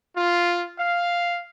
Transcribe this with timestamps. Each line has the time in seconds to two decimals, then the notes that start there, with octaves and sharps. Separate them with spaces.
0.17 F4
0.78 F5